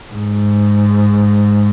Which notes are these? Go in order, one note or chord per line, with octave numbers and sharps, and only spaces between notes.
G#2